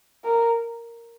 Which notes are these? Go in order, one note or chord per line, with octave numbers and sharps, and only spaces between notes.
A#4